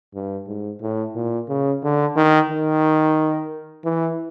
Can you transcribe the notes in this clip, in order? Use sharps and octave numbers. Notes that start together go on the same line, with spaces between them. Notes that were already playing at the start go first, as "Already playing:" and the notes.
G2
G#2
A2
A#2
C#3
D3
D#3
D#3
E3